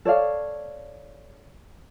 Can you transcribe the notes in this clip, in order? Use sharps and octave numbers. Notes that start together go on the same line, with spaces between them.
A4 C#5 D5 F5